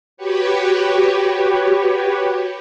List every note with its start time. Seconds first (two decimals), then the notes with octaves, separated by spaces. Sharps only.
0.17 F#4 G4 B4 C#5